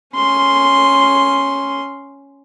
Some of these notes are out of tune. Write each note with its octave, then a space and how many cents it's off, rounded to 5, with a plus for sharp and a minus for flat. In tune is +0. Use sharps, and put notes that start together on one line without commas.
C#4 +0 C6 +0